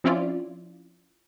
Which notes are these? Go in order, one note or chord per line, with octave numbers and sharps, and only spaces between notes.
F3 C4 C#4 E4 F4 D5